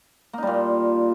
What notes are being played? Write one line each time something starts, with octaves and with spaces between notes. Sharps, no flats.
A#2 G3 A#3 D#4